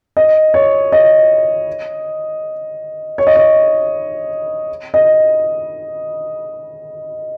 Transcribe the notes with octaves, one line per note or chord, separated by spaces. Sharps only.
D#5
C#5
D#5
C#5
D#5
C#5
D#5